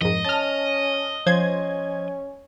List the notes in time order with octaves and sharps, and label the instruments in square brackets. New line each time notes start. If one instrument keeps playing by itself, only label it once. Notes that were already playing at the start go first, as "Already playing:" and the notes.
[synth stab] F2 G#2 [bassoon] D#3 [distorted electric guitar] D#5
[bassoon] C#4 [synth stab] A5 F6
[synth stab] F3 C5 G#6 [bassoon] C#4